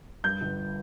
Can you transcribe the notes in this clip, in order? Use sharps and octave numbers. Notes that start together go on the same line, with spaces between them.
G2 G6
G1